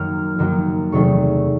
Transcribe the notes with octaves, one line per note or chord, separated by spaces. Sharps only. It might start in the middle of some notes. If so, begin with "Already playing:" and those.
Already playing: F#2 D#3 F#3 A#3 F6
F#2 D#3 F#3 A#3
E2 C3 D#3 F#3 A3 C#6